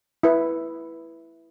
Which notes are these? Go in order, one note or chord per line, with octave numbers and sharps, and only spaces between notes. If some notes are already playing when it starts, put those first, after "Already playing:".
E4 B4